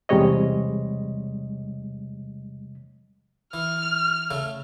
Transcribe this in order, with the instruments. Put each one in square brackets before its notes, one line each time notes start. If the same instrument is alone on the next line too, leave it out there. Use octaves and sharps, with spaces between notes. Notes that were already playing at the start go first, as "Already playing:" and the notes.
[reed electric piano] E2 C3 G3 G#3 C#5 D#5
[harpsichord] E3 [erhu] F6
[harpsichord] C#3 A3